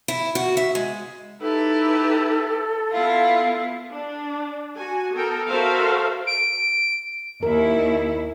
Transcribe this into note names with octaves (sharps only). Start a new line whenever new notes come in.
E4
F#4
E5
G#3
D#4 E4 G4 A4 B4
B3 E4 F4 F5
D4
F#4 G#5
B3 A4 A#4 G5
F#4 A4 A#4 C5 E5 F5
D7
D#2 E4 A#4